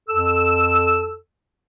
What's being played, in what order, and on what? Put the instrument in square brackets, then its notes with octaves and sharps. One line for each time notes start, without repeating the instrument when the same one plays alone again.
[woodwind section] F2 A4 E6